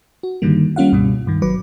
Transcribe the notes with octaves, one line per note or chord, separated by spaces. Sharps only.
F#4
G2 D3 D#3 G3 A#3
G3 A#3 C#4 F4 F5 F#5
C#2 G2 B2 G3
G2 D#3
G#1 F#3 B4 D6